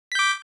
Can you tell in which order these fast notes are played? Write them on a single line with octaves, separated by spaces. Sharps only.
B6 G6 D6